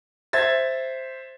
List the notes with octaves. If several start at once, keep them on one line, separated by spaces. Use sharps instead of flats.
C5 E5 G#6 A6